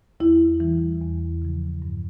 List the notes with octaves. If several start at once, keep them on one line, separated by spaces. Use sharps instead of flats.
E2 E4
E3 G3
E2
C#3 F3
G2